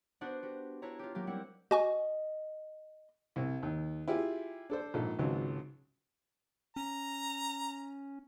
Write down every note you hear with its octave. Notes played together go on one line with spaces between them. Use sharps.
B3 D4 F#4 C5 F#5
F#4 G4
D4 E4 C#5 A#5
F4 G4
F#3 A#3 G4
G3 A#3 C4 E4 F#5
F#4 D#5 G#5 C#6
C2
D#2
E4 F4 G4 G#4
D4 A4 C5
A#1 G#2 A4
G#1 C#2 C#3 F#3
C#4 A#5